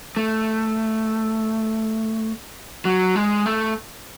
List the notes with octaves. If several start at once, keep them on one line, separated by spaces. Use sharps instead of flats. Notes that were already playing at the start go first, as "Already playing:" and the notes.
A3
F#3
G#3
A3